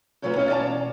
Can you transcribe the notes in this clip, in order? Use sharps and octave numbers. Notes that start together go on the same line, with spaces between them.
A2 C3 F#3 A3 F4 B4
C#4 E4 D#5 F5
E2 B2 C#4 D5 A5 A#5